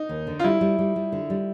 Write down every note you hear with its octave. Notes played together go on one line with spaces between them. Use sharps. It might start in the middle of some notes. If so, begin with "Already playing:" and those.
Already playing: D#4
D#2
D3
F4
G3 E4
G3
G3
G3
D3
G3